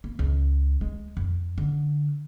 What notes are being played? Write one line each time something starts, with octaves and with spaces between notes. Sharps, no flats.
A#3
C#2
G#3
F2
D3